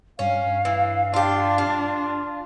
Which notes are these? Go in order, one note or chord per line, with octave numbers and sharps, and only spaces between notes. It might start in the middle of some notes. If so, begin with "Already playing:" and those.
G2 C#4 F5
E3
D4 F4 G4
F4